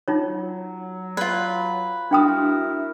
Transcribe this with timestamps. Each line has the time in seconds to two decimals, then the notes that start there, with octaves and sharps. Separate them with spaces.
0.08 D#4 F4 C#5
0.25 F#3
1.17 F4 B4 D5
2.11 D4 E4 F#4 A#4 G5 D#6